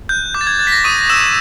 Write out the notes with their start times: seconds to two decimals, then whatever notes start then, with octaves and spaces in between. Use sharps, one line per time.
0.09 F#6 G6
0.34 D6 G6
0.41 A6
0.47 G#6
0.59 F#6 A6
0.67 B6
0.72 A#6
0.84 C#6 D#6 D#7
1.09 E6 G6 E7